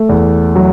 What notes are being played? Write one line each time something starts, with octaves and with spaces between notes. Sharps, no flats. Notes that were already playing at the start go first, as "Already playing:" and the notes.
Already playing: A3
E2
F#3